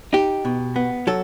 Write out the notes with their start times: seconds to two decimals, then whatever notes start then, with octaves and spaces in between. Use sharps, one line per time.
0.13 D#4 G4
0.45 B2
0.76 B3
1.07 F#3 A4